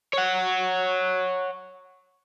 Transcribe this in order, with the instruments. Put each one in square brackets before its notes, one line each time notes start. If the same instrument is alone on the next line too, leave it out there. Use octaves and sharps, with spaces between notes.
[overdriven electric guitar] C#5 F#5